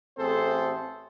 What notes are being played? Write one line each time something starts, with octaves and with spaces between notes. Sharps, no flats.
A1 A3 C4 G#4 A4 C5